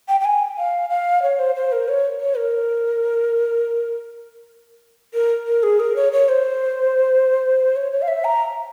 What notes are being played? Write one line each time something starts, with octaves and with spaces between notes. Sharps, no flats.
G5
G5
G#5
F5
F5
C#5
C5
C5
A#4
C#5
C#5
A#4
A#4
A#4
G#4
A#4
C#5
C#5
C5
C#5
C#5
F5
E5
A#5